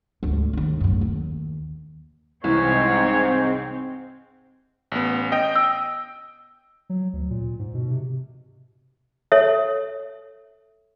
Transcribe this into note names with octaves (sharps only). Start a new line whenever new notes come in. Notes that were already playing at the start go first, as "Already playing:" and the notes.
D2 G#2
D#2 D#3
F#2 A2
D#2
C2 G#2 E3 C4 C#5
A1 B3
D#5 G5
E6
F#3
D2
A#2
G#2
B2
C3
A4 C#5 E5